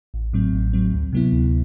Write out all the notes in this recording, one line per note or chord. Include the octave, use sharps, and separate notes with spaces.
A1
A2 F#3 C4
A1
A2 F#3 C4
D2
C3 F#3 B3 E4
D2